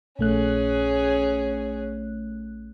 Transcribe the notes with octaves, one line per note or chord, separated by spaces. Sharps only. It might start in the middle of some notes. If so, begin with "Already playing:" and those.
A#1 A3 C#4 G#4 F#6